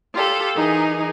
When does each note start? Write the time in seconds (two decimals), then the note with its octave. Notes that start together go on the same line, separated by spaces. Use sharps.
0.13 F4 G4 A4
0.55 E3 D#4 G#4 A#4